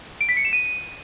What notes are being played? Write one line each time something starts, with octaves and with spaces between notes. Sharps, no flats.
D7
B6
C#7
E7
D#7